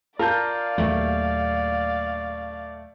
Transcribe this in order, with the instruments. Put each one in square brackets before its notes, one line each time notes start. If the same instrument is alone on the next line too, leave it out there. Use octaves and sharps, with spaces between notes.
[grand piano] F4 A5 G6 [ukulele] A#4 [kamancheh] D5 F5
[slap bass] D#2 A#2 F#3 [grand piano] A3